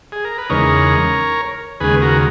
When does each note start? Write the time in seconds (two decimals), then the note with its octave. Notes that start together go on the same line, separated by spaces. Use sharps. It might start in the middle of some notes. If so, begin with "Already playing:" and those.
0.12 G#4
0.25 A#4
0.38 B4
0.49 E2 C#3 G#3 D#4 A#4 C#5
1.80 D#2 C#3 G#3 G#4 B4
2.02 F#4 A#4